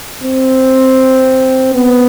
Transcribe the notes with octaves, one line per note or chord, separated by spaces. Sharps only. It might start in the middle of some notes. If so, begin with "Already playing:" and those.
C4
B3